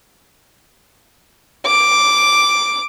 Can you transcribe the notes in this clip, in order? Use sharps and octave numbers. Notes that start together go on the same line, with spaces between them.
D6